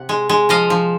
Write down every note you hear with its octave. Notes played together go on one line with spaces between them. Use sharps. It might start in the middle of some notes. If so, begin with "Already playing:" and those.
Already playing: C3 F#5
G#3
G#3
F3 D#5 F5
F3